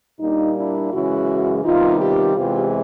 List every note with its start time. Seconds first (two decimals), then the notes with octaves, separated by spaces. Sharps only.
0.20 A#2 G3 A#3 D4 D#4
0.55 D4 E4
0.92 F#2 C#3 E3 G#3 C#4 E4 F#4
1.64 C3 D#3 G3 B3 D#4 F4
2.00 F4 G4
2.36 E2 C3 E3 G#3 F4 G4